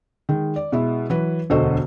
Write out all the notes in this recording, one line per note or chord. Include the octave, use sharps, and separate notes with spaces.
D#3 G#3
D5
B2 G#3 E4
E3 F#3 B4
E1 D2 F#4 A4 C5 D#5